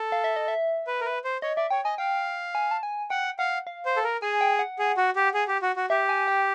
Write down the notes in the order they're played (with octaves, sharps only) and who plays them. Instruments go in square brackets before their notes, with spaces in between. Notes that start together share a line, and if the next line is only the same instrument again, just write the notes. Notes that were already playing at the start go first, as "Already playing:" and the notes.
Already playing: [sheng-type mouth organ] A4
[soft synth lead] F5
E5
D#5
E5
[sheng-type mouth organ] B4
A#4
B4
C5
[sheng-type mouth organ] C#5 [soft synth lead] D#5
[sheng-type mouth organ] D5 [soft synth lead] E5
[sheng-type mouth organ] C#5 [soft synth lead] G5
[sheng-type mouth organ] D#5 [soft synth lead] G#5
[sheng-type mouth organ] F5 [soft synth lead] G5
[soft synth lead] G#5
A5
G#5
[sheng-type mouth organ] F#5 [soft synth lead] G5
[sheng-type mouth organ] F5 [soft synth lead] F#5
[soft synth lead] F5
[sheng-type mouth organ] C5
A4
A#4
[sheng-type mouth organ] G#4 [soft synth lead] G#5
[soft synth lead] G5
F#5
[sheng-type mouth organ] G#4
F#4
G4
G#4
G4
F#4
F#4
[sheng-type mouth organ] G4 [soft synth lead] E5
[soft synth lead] G#5
G5